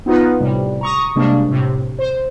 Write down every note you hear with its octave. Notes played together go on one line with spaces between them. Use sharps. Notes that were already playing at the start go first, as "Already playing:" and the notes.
B3 D#4 F4 B4
A2 C3 G3
A#5 C#6 D#6
C3 G3 G#3 A#3 D4
A2 C3
C5